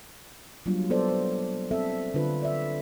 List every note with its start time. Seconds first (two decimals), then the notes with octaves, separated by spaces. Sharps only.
0.66 F#3 G3 A#3 D4 F4
0.90 B3 A4 C5 D5
1.09 C5
1.71 C4 A4 E5
2.14 D3 D4 F4 B4
2.43 D5 E5